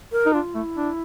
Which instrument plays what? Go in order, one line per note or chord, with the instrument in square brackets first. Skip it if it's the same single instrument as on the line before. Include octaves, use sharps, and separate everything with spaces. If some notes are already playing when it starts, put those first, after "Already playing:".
[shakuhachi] A#4
[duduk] D#4
[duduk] D4 [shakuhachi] F4
[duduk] A3 [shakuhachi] E4
[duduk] D4